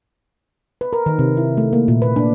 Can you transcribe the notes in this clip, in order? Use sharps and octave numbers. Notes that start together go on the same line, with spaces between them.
B4
A#4
D#3
C3
E4
A3
A#3
A#2
B4
D4